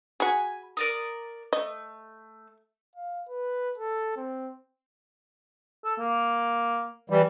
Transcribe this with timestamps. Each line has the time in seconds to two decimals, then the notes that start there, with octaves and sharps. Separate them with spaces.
0.20 F#4 G#4 G#5 B5
0.77 A#4 D5 D#6
1.53 A3 D#5
2.96 F5
3.28 B4
3.78 A4
4.17 C4
5.85 A4
5.99 A#3
7.10 E3 G3